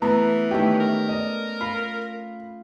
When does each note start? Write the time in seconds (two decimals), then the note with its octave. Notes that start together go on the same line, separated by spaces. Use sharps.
0.02 E3 A3 B3 A#5
0.51 D#3 A3 C#4 G4
0.80 A#4
1.09 D5 D#5
1.61 F4 B5